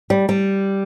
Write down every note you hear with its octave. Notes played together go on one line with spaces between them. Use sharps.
G3
G3